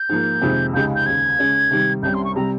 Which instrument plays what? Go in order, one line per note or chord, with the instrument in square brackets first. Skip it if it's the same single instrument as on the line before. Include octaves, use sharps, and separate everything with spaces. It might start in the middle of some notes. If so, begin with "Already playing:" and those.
Already playing: [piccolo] G6
[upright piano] G#2 F3 A#3
F2 C3 D#3 G#3
[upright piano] C#2 C#3 G#3 D#4 G4 [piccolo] G6
[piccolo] G6
[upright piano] D#2 C#3 G#3 [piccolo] G#6
[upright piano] C#3 G#3 C#4
C3 D#3 G3
[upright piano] C2 C3 G3 C#4 [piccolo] G6
[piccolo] C6
C#6
[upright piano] C3 G3 C4 [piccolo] A#5